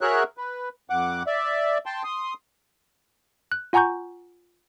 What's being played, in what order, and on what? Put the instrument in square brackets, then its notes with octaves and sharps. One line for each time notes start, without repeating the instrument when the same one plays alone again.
[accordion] F#4 G#4 A#4 C#5 E5 F#6
B4
F2 F#5 D6
D5 E5
G5 A5 C6
C6 D#6
[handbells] F#6
F4 F#5 G#5 A#5 C#6 G6